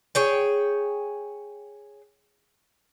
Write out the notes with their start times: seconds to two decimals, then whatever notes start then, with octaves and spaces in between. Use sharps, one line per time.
0.15 G#4 C#5 G5